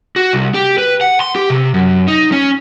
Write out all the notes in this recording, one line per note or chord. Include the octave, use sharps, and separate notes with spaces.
F#4
C2
G4
B4
F#5
C6
G4
C3
F#2
D#4
C#4